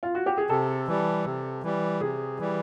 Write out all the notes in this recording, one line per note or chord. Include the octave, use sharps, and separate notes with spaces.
F4
F#4
G4
G#4
C3 A4
E3 G3
C3
E3 G3
C3 G#4
E3 G3